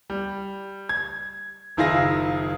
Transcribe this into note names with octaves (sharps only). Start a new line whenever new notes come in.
G3
G#6
F#1 D#3 E4 F4 G#4 A#6